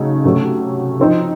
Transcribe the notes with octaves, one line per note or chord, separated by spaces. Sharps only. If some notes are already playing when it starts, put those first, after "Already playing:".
Already playing: C#3 F#3 A3 D#4
C3 F#3 A3 C#4
F3 C4 D#4